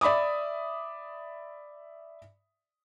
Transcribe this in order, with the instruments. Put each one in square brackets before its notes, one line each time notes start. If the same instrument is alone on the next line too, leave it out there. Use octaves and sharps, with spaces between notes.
[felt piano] D5 E5 B5 D6 D#6